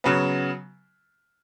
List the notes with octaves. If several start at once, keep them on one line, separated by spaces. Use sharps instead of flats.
C#3 F#3 B3